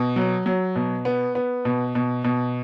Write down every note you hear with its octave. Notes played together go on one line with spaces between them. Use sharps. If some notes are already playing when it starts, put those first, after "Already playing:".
Already playing: B2
F#3
F#3
B2
B3
B3
B2
B2
B2